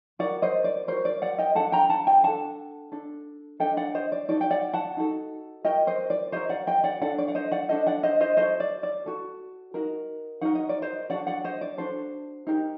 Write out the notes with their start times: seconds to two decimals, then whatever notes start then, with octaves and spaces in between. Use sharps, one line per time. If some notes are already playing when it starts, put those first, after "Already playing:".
0.19 F#4 A#4 D5 F#5
0.42 C5 D#5
0.64 D5
0.88 F#4 A#4 C5
1.05 D5
1.22 D5 F#5
1.38 D#5 G5
1.55 D4 A4 F#5 A5
1.72 G5 A#5
1.90 F#5 A5
2.07 D#5 G5
2.23 D4 A4 F#5 A5
2.92 D4 A4
3.60 D4 A4 D#5 G5
3.77 D5 F#5
3.95 C5 D#5
4.12 D5
4.28 D#4 F#4 A4 D5
4.41 G5
4.50 D5 F#5
4.73 F#5 A5
4.97 D#4 F#4 A4
5.65 F#4 A#4 D#5 G5
5.87 C5 D#5
6.10 D5
6.32 F#4 A#4 C5 D#5
6.49 D5 F#5
6.67 D#5 G5
6.84 D5 F#5
7.01 D4 A4 D5 F#5
7.18 D5
7.28 F#5
7.35 C5 D#5
7.52 D5 F#5
7.69 D4 A4 C5 D#5
7.86 D5 F#5
8.03 C5 D#5
8.21 C5 D#5
8.37 F#4 A4 C5 D#5
8.60 D5
8.83 D5
9.06 F#4 A4
9.74 D#4 F#4 A#4
10.41 D#4 F#4 A#4 F#5
10.55 D#5
10.69 D5
10.82 C5 D#5
11.10 D4 F#4 A4 D5 F#5
11.27 D5 F#5
11.44 C5 D#5
11.61 D5
11.78 D4 F#4 A4 C5
12.47 D#4 G4 A#4